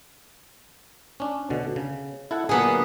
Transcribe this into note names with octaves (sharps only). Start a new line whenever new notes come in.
C#4 D4
B2 D3
C#3
E4 A4 F#5
A#2 D3 F#3 A#3 B3 G#4